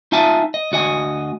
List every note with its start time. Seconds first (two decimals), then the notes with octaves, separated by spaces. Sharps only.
0.12 D#4 F4 E5 G#5 A5
0.54 D#5
0.72 D2 F#4 D#5 G#5